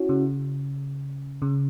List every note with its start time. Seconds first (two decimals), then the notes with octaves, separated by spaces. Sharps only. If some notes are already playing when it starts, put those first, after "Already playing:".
Already playing: C#4 E4 F#4
0.09 C#3
1.42 C#3